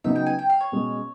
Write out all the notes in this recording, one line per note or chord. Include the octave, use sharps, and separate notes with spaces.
C#3 F#3 B3 D#4 E5
G5
G#5
G5
F5
C#5
B2 G#3 C#4